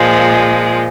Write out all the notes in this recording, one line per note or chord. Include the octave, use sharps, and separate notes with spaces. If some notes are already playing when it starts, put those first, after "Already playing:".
Already playing: A#2 F3 G#3